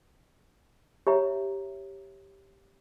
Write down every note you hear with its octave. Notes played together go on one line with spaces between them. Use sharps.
G4 C#5 E5 A#5